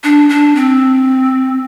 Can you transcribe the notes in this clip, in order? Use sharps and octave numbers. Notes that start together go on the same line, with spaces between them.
D4
D4
C4